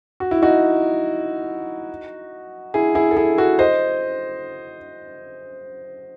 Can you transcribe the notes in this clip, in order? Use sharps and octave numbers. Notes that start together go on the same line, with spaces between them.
F#4
E4
D#4 F#4
E4 G#4
E4 G#4
A4
E4 G#4
F#4 A4
C5 D#5